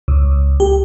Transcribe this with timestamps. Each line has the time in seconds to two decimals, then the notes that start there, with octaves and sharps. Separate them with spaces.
0.08 C#2
0.60 G4